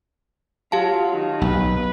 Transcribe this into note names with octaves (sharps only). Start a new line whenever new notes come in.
F#3 F4 G4 F5 A5
D#3
B1 B4